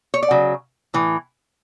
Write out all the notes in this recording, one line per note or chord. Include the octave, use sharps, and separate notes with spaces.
C#5
D5
C#3 F#3
A2 E3